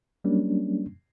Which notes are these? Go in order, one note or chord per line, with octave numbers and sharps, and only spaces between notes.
F#3 G3 A#3 C#4 D4